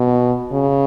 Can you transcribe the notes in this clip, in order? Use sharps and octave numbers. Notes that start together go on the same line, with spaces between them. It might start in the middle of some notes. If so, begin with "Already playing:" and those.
Already playing: B2
C#3